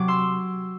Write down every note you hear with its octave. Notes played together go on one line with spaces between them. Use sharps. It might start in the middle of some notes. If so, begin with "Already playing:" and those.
Already playing: C3 F#3 D6
C6 E6